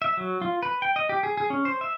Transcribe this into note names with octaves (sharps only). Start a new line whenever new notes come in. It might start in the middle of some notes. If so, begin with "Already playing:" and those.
E5
F#3
F4
B4
G5
D#5
G4
G#4
G#4
C#4
C5
E5